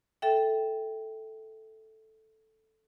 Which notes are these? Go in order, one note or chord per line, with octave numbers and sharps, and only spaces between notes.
A4 E5 G5